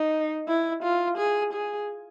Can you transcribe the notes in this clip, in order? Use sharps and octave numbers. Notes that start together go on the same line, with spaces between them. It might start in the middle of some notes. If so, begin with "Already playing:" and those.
Already playing: D#4
E4
F4
G#4
G#4